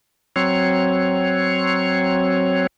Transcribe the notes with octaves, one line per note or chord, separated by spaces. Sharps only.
F#3 C4 C#5